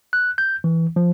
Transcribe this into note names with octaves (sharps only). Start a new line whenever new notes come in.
F#6
G6
E3
F3